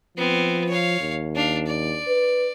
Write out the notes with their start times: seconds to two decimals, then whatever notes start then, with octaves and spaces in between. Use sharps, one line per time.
0.17 F3 B3 C4
0.69 C#5 F5
1.01 D#2
1.35 D4 F5
1.66 D5
2.07 B4